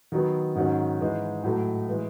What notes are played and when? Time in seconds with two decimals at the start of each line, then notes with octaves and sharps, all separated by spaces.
0.12 D#3 F#3 B3
0.55 G#2 D#3 F#3 C#4
1.00 G#2 E3 G#3 D#4
1.44 A2 F#3 A3
1.89 E3 G#3